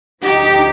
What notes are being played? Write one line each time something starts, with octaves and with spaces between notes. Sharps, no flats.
D2 D3 F3 D#4 G4